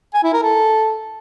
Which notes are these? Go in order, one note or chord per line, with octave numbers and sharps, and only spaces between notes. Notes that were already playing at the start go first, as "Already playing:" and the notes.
G#5
E4
A#4
A4